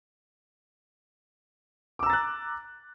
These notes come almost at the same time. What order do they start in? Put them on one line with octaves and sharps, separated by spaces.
D6 E6 A#5 A6 F#6